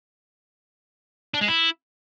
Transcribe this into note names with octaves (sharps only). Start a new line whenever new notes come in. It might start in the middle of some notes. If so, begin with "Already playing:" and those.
D4
G#3
E4